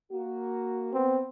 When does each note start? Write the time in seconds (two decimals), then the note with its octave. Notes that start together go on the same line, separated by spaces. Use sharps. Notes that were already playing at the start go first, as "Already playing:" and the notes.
0.12 A#3 F#4
0.93 B3 C4